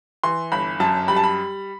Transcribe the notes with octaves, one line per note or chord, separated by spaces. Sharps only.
E3 C6
G1 B5
F#2 A5
G3 B5
A5
B5